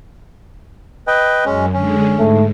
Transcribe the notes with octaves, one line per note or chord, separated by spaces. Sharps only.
B4 D#5 G5
F#2 G#3 C#4
D3 G#3 C#4
G#2 A3